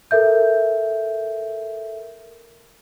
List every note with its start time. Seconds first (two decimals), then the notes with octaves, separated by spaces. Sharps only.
0.11 A4 A#4 E5 G6